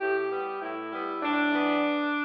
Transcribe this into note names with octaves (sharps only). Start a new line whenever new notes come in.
A2 G4
G3 B3
A2 E4
G3 B3
A2 D4
E3 B3